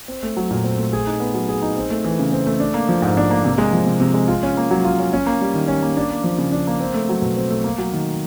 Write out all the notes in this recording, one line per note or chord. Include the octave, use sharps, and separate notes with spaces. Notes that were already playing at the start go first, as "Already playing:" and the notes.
C4
A3
F#3
A#2
C4
A3
G#4
D#4
B3
F#3
G#4
D#4
C4
A3
E3
C#3
C4
A3
D4
A#3
F3
G#2
D4
A#3
C3
G#3
F3
C3
C3
G#3
F4
C#4
A#3
F#3
F4
C#4
C#4
A#3
G3
D#3
C#4
A#3
D4
A#3
F3
C#3
D4
A#3
C4
A3
F#3
B2
C4
A3
A#3
F#3
D#3